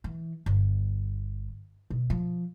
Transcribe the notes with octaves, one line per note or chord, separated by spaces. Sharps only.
E3
G1
B2
F3